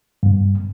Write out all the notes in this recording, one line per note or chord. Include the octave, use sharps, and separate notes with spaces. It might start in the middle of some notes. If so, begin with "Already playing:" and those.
G2